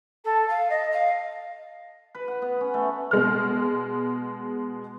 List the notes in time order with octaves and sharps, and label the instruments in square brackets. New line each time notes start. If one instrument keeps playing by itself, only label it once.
[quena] A4
F5
D#5
F5
[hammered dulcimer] B4
F#5
B3
C#4
A3
[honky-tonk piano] B2 G#3 F6